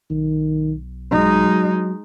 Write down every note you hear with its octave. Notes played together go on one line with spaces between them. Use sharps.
B1 D#3
F#3 G#3 D#4